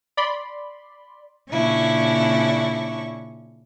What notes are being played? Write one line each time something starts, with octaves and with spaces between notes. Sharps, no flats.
D5 B5 C6
A#2 C#3 C#4 D4 E4 C#6